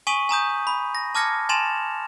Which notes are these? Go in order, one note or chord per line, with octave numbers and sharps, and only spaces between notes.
G#5 C#6 D#6 B6 D#7 F#7
G#5 A#5 D#6 G6
B5
A#6
A5 D6 F6 G#6 A#6 C#7
G#5 A5 C6 A6 E7 F7